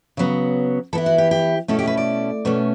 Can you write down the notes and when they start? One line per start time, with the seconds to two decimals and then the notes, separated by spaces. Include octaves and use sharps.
0.17 C#3 F#3 B3
0.93 E3 B3 E4 A4
1.06 F#4
1.18 G4
1.31 G4
1.68 B2 A3 C#4 E4 A4
1.79 G4
1.87 B4
1.97 D5
2.45 B2 A3 C#4